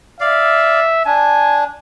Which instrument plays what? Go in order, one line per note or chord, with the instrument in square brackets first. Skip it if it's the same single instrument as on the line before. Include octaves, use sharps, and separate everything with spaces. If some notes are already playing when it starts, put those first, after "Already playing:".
[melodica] D5 F5 [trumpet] E5
[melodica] D4 [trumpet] G#5